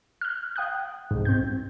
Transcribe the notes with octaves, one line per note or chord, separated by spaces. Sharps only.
F6 F#6
F5 G5 D#6 F#6
C2 G#2
C4 G6